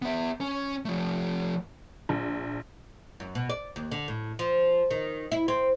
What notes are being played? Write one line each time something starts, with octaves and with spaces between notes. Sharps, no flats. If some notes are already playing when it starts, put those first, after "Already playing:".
B3 E5
C#4
F3 A3
A#1
F#2
B2
D5
D#2
D3
A2
F3
D#3
E4
C4